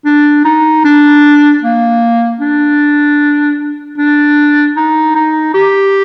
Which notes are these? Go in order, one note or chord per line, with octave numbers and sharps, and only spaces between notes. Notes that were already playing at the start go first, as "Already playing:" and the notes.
D4
D#4
D4
A#3
D4
D4
D#4
D#4
G4